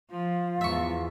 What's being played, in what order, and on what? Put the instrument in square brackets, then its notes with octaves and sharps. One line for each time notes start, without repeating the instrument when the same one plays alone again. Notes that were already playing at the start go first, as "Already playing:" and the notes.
[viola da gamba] F3 [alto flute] F4
[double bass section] E2 [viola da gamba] G#2 [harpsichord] E5 C#6